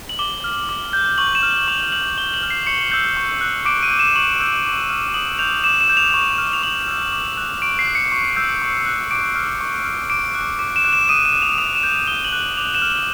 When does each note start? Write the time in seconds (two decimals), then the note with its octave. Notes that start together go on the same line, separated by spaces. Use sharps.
0.09 F#7
0.19 D6 G7
0.44 F6
0.69 D6
0.93 G6
1.18 C#6 F#7
1.35 E7
1.43 F6
1.68 C#6 F7
1.92 F6 F#7
2.18 C#6 G7
2.34 F#7
2.43 F6
2.50 C7
2.67 C#6 C#7
2.92 E6 G6
3.17 C#6
3.41 F#6
3.66 D6 D7
3.83 D#7
3.91 G6
3.99 E7
4.16 C#6 F#7
4.40 E6 G6
4.66 D6
4.90 F6
5.14 D#6 F#7
5.39 G6 F7
5.64 D6 E7
5.81 E7
5.89 G6
5.97 F7
6.14 C#6
6.38 F6
6.53 F7
6.63 C#6 F#7
6.88 E6 G6
7.13 D6
7.37 F#6
7.62 C#6 D7
7.79 C7
7.87 F#6
7.95 C#7
8.12 C#6
8.36 E6 G6
8.62 C#6
8.86 F#6
9.11 D6 D7
9.36 F6
9.61 C#6
9.85 F6
10.10 D6 D7
10.35 F#6
10.59 D6
10.76 E7
10.84 F#6
10.93 E7
11.09 D#6 D#7
11.25 E7
11.33 F#6
11.42 F7
11.58 D#6 F7
11.75 E7
11.83 G6
11.92 F7
12.07 D#6 G7
12.25 F#7
12.33 F#6
12.40 F#7
12.57 D6 F7
12.74 E7
12.82 F6